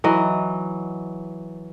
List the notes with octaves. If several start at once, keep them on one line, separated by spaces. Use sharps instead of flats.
E3 F#3 D#5